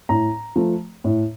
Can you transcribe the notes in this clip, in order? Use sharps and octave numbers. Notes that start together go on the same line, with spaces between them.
A2 A#5
F3 A3
A2